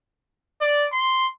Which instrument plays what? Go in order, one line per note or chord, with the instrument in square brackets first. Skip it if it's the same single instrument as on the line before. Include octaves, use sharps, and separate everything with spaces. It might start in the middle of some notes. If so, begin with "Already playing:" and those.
[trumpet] D5
C6